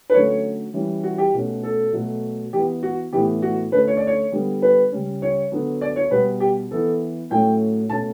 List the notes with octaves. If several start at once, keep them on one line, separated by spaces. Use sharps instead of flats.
B4
D3 F#3 A3 C#4 C#5
E3 G3 C#4
F#4
G4
B2 A3 C#4
A4
B2 F#3 A3
E3 B3 G4
F#4
A2 E3 B3 G4
F#4
D3 A3 C#4 B4
C#5
D5
C#5
D3 G3 B3
B4
C#3 G3 C#4
C#5
D3 F#3 B3
D5
C#5
B2 G3 B3 B4
G4
E3 B3 A4
A2 F#3 A3 C#4 G5
B2 A3 C#4 A5